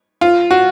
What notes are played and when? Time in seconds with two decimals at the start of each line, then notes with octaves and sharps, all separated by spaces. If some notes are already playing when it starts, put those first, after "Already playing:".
0.21 F4
0.51 F#4